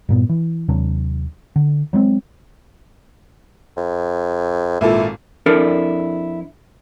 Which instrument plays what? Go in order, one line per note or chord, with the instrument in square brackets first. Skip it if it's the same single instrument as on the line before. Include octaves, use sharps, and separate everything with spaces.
[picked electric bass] G2 A#2 B3
E3
D#2 C3 F#3 D4
D3
F#3 G#3 B3 C4
[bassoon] F2
[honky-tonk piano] G#1 A#2 A4 [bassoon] E4
[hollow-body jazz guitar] F2 D4 E4 A4 A#4 D5